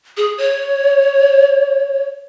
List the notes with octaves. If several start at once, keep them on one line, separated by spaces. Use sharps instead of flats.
G#4
C#5